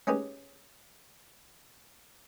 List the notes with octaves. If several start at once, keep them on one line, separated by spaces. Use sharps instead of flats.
C#4 D#4 G4 G#4 B4